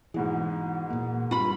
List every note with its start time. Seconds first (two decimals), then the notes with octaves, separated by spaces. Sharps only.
0.14 G#2 B2 E3 G#4
0.90 A#2 A#3
1.31 G2 F4 B5